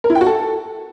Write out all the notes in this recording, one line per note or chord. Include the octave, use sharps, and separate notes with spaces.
A#4
E4
G5
F#4
A4